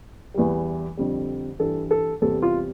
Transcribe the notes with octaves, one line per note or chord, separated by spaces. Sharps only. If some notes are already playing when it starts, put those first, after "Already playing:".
E2 E3 G3
F2 D3 G3
G2 E3 G3 A4
A4
E2 C3 G3 A4
F4